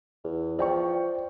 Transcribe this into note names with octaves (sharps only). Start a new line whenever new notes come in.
E2
F3 D5 G5 C#6